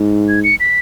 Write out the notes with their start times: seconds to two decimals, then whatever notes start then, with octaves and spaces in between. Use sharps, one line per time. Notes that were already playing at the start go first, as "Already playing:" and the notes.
Already playing: G#2
0.28 G#6
0.44 C#7
0.60 B6